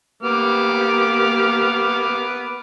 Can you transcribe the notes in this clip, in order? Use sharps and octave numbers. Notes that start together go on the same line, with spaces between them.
A#3 B3 G4 D6 F6